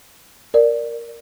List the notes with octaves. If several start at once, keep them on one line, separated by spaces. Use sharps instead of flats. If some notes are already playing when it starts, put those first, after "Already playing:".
A#4 D5